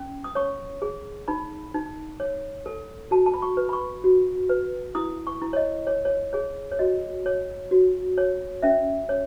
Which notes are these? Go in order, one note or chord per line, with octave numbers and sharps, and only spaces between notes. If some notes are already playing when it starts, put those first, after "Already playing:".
Already playing: C#4
D#6
C#5 C#6
G#4
D#4 B5
D#4
C#5
A4
F#4 A5
A5
B5
C#6
B4
B5
C#6
F#4
B4
E4 D#6
C#6
E4
C#5
D#5
C#5
C#5
G#4 C#5
C#5
F#4 D#5
C#5
F#4
C#5
C#4 E5
C#5